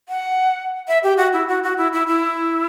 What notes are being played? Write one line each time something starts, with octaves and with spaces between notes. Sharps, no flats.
F#5
E5
G4
F#4
E4
F#4
F#4
E4
E4
E4